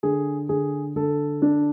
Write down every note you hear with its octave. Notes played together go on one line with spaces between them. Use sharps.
D3 G#4
D3 G#4
D3 A4
D4